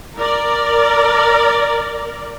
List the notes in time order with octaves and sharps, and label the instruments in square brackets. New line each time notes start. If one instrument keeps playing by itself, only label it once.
[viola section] A#4 D5